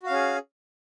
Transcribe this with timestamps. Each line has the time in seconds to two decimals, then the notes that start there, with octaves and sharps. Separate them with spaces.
0.03 F#4
0.06 F5
0.10 C#4
0.13 G#4